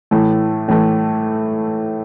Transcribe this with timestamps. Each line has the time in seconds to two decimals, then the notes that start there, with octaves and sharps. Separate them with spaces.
0.11 A2 E3 A3
0.68 A2 E3 A3